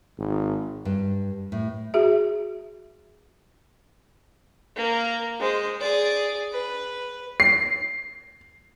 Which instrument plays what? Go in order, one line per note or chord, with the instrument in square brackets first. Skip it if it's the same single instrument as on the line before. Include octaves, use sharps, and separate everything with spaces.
[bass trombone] G#1
[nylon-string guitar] G2
A2
[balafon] F#4 G#4 E5
[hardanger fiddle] A#3 A#4
G#3 C5
G#4 D5
B4
[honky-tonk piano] C7